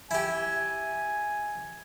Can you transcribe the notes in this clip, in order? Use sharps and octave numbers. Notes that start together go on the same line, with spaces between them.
E4 G4 G#5